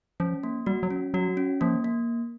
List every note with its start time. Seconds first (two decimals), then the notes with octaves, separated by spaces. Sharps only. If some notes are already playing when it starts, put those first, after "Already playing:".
0.20 F3 C#4
0.43 A#3
0.66 G3 F#4
0.83 F#3
0.91 C#4
1.14 F#3 F#4
1.37 C#4
1.61 F3 A#3
1.84 A#3